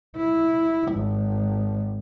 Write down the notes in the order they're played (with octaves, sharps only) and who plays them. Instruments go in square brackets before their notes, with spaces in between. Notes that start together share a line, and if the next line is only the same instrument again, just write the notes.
[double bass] E4
G#1